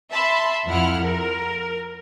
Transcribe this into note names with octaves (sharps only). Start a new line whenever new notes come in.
E5 A5 B5 C6
F2 F3 E4 F#5 F6
A#4